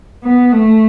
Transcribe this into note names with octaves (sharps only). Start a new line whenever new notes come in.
B3
A3